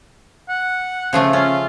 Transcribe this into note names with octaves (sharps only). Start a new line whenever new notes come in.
F#5
C#3 F3 A3
C#4 F4